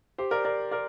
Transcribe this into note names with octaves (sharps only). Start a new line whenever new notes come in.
G4 C5
A#4 D5
A#4 D5
A#4 D5